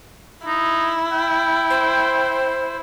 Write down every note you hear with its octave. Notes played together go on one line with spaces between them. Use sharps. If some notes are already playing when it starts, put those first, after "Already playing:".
D#4 E4
G5
C5